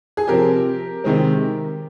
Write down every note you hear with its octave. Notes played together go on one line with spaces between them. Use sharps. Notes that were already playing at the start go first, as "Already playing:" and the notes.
G#4
C3 F3 C4 G4 A#4
C3 D#3 G#3 C4